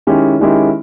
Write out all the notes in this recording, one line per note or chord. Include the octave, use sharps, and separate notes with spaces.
D#3 G#3 C#4 E4 G4
D#3 G#3 C#4 E4 G4